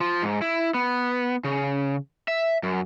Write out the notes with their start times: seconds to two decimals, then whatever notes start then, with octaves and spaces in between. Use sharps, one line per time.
0.01 F3
0.22 G#2
0.42 E4
0.74 B3
1.44 C#3
2.28 E5
2.63 F#2